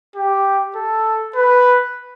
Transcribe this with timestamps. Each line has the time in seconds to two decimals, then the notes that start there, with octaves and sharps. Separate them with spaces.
0.15 G4
0.75 A4
1.36 B4